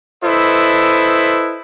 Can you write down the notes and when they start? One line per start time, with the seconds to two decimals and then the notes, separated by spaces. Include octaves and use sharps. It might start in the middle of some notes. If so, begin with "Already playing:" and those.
0.24 E4 A4 B4 C5 D#5